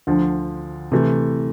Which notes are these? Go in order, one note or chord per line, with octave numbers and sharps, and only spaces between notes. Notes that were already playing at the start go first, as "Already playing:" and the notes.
D2 D3 F3
C3 E3 A3